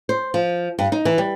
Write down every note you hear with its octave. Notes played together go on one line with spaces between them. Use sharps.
C5
F3
G2
D#4
E3
G3